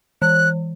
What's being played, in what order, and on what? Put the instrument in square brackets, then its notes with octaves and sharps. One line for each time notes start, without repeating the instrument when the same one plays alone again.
[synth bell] E3 [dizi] F#6